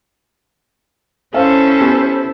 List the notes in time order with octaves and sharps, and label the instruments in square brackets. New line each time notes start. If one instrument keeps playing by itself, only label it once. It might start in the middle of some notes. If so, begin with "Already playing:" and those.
[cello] C#4 [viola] E4 A4 [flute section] C5 [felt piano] F5
[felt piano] B3 G4 G#5